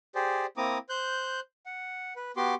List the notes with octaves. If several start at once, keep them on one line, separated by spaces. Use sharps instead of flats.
G4 G#4 C5 D5
A#3 C4 E4 A#5 D6 D#6
C5 F#6 G6
F#5
B4
B3 F#4 G4 C6 D6